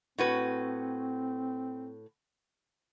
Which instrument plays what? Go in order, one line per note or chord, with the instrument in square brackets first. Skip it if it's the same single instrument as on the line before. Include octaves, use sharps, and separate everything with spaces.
[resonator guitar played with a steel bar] A2 F#4 B4 [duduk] C4